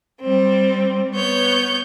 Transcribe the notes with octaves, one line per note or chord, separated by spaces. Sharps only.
G3 C4
B3 C#5 G6